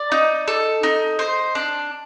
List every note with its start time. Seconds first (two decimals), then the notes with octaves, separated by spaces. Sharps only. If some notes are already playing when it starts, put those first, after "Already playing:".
Already playing: D5
0.12 D#4
0.48 A4
0.83 D#4
1.19 C5
1.55 D4